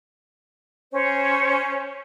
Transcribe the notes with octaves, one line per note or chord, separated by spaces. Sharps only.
C#4 C5 C#5